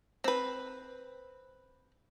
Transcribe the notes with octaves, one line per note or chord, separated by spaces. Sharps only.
C4 B4